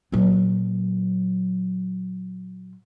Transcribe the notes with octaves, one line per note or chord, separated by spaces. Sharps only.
A#2 F#3